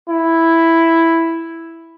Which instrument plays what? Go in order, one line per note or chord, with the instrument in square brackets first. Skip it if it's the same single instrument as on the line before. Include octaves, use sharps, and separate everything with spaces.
[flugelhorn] E4